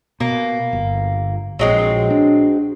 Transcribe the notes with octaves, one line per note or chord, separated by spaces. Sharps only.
B2 A#3
G1
A#1 F#3 G#3 C4
D4